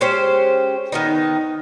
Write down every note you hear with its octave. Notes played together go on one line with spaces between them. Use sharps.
G#3 C#4 G4 C5
D#3 B3 D#4